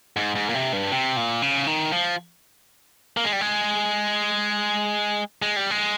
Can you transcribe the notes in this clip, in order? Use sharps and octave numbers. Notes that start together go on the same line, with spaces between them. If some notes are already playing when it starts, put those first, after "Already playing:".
G#2
G#2
A#2
C3
G2
C3
A#2
C#3
D#3
F3
A#3
G#3
G3
G#3
G#3
G3
G#3